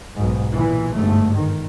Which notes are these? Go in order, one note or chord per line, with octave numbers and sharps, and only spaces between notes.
B1 G#2
A#2 E3
G1 G#2 A3
D#3